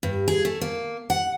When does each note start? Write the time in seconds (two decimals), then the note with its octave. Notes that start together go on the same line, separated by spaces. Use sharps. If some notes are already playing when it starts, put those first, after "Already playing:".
0.03 G2
0.28 G#4
0.45 A3
0.61 A#3
1.10 F#5